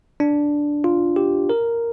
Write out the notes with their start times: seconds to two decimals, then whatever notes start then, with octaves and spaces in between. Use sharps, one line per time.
0.20 D4
0.84 F4
1.16 G4
1.50 A#4